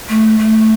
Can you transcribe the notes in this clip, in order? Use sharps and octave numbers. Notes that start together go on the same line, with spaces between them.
A3
A3